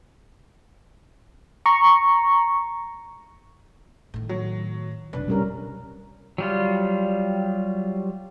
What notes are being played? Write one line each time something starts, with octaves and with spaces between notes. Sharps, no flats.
A#5 C#6
A2 D#3
F#3
F1 B1 D4 B4
G3 C#4 A#4
F#3 G3 F4